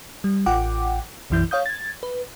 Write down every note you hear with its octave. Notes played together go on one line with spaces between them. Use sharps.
G3
A1 F4 F#5 G5 D6
B1 F#2 E3 E4 G6
C#5 F5 D#6 G6
G#6 A6
B4